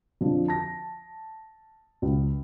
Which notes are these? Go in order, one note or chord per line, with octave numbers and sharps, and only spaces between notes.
F2 D3 F3
A5 A#6
C#2